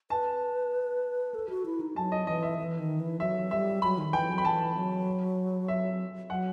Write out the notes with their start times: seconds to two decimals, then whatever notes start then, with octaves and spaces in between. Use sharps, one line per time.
0.10 B4 A5
1.35 A4
1.50 F#4
1.66 E4
1.81 D#4
1.96 F#3 A5
2.12 D#5
2.27 E3 D#5
2.43 E5
2.58 E3
2.79 D#3
3.00 E3
3.20 F#3 E5
3.51 G3 E5
3.82 F#3 B5
3.98 D#3
4.13 E3 G5
4.29 F#3
4.38 B5
4.45 E3 A5
4.75 F#3
5.68 E5
6.30 F#3 F#5